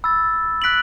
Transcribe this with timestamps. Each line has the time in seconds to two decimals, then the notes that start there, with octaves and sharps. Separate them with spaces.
0.04 B5 E6 A6
0.62 F#6 B6 D7 F#7